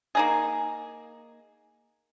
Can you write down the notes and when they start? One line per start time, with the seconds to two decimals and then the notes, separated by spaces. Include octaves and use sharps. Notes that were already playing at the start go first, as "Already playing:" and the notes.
0.15 A#3 D#4 G#4